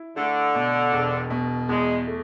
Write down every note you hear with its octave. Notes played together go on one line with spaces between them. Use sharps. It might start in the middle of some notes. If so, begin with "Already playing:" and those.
Already playing: E4
D3 A3
B2
E1
B2
E2 G#3
A3